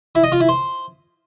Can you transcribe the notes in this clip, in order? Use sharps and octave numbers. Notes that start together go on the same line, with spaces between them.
E4
D#5
F4
E4
C5